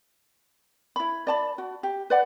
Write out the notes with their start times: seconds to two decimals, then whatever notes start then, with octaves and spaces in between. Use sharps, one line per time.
0.96 E4 B5
1.27 D5 A5 B5
1.58 F#4
1.83 G4
2.10 B4 D5 F#5